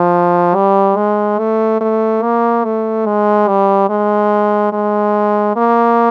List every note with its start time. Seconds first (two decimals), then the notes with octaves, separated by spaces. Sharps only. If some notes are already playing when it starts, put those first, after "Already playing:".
Already playing: F3
0.55 G3
0.96 G#3
1.39 A3
1.81 A3
2.22 A#3
2.64 A3
3.06 G#3
3.48 G3
3.90 G#3
4.72 G#3
5.56 A#3